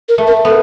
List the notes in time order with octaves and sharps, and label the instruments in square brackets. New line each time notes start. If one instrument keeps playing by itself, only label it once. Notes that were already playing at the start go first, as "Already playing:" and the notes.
[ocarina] A#4
[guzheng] A3
[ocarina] A#4
[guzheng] B3 [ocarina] A4